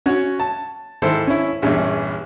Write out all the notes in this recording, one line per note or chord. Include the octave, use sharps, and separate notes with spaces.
C#4 F#4 C#5
A5
G#2 D#3 E4 A4 C5
C#4 E4
A#1 E2 G2 C#4